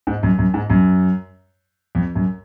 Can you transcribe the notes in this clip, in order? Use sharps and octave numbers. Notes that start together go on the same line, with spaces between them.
G#2
F#2
F#2
G#2
F#2
F2
F#2